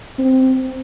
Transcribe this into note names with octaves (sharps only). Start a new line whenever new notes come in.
C4